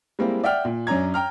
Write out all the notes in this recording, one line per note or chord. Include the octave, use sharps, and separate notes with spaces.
G3 G#3 A#3 C4 E4
D5 E5 F#5 G5 F6
A#2
F#2 C#4 D4 A#5 G#6
G5 A#5 F6